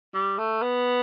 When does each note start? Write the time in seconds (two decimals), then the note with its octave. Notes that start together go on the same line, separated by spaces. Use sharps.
0.14 G3
0.38 A3
0.62 B3